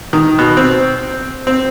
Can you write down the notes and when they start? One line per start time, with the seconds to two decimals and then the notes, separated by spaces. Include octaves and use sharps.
0.13 D#3
0.38 B2
0.57 C4
1.47 C4